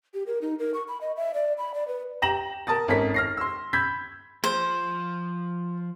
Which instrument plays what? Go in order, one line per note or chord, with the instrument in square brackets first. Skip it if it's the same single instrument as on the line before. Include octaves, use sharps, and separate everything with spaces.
[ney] G4
A#4
D#4
A#4
C#6
B5
D#5
E5
D5
B5
D5
B4
[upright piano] G4 G5 A#5 A#6 E7 F#7
A#4 A5 D#6 A6
G#1 C#4 A4 A#4 B6
F6 A#6 C7
C6 E6
B5 E6 G6 G#6 B6
[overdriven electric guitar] F3 [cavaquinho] C5